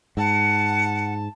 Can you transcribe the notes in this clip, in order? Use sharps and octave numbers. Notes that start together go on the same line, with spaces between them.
G#2 F#5 A5